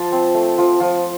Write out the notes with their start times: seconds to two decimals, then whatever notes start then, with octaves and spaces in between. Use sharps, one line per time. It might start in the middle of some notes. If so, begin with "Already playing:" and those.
Already playing: F3 A5
0.12 C4
0.34 A3
0.58 F3
0.80 F3